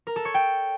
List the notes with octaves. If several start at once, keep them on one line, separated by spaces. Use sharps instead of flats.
A#4
A4
C#5
G5